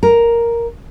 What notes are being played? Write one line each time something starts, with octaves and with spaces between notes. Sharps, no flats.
A#4